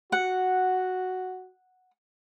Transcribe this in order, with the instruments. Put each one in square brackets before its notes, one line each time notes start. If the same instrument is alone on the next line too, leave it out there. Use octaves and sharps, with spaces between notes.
[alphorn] F#4 [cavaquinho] F#5